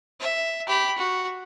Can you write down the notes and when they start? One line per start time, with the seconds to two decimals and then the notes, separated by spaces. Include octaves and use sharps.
0.20 E5
0.68 G4 B5
0.98 F#4